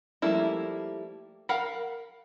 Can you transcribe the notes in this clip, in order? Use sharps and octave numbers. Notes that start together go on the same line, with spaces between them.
F3 G3 A3 A#3 E4
A#4 F5 F#5 B5